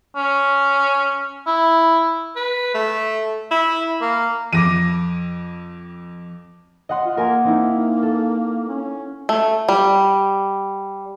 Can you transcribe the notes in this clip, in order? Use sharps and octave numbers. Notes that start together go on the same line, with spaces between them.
C#4
E4
B4
A3
E4
A#3
F2 D6 A#6 D#7
D#5 F#5 C6
F4
A#3 A#4 G#5 A#5
C4 D#4 E4
A4
C#4
A3
G3